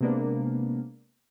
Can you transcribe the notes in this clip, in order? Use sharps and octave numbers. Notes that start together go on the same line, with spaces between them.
C3 G#3 A#3 B3 D4